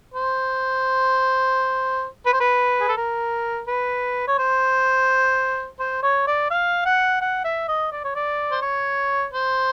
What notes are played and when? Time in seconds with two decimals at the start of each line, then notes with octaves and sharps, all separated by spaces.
0.14 C5
2.26 B4
2.33 C5
2.40 B4
2.80 G#4
2.88 A4
2.97 A#4
3.67 B4
4.28 C#5
4.38 C5
5.80 C5
6.03 C#5
6.27 D5
6.50 F5
6.85 F#5
7.21 F#5
7.44 E5
7.68 D#5
7.92 D5
8.04 C#5
8.15 D5
8.51 C5
8.62 C#5
9.33 C5